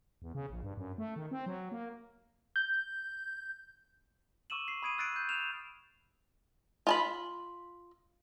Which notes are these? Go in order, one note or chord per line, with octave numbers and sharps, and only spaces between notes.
E2
C#3
A#1
G2
F#2
A3
D#3
C4
F#3
A#3
G6
C#6 D6 E6 D#7 E7 F#7
C7
B5 D#6 G#6 D7 D#7
E6 F#6 A6 C7 D7
E6 G6
F6 E7 F7
F4 A5 B5